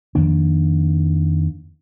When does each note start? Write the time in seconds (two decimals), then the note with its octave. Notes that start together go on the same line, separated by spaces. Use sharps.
0.15 F2 D#3 A#3 D4